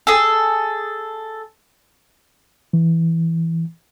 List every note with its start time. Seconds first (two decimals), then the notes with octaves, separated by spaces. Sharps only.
0.07 G#4 A4
2.73 E3